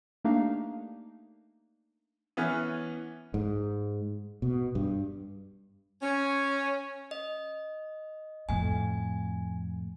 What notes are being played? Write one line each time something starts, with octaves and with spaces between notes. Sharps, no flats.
A3 A#3 D4 D#4 G4 F5
E3 B3 C#4 F6
G#2
B2
G2
C#4
D#5
F2 A2 G#5